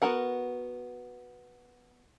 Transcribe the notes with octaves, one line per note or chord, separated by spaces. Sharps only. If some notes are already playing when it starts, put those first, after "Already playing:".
B3 F#4 A#4 F#5